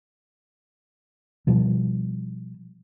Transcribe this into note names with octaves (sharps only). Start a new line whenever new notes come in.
B2 F3 G3